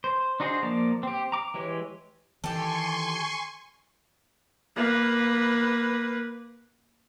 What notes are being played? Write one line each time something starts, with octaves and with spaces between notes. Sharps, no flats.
C5
D4 D#4 F#4 G#4 C5
F3 A#3 D5 A5 A#5
C4 G4
A#5 D6
E3 G#3 G4 C#5
D#3 E3 G4 A4 G#5 C6 C#6
A#3 B4